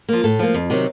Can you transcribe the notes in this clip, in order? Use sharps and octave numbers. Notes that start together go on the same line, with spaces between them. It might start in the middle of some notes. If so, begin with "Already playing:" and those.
F3 A#3
A2 A4
F3 A#3
F2
C3 D#3 F#3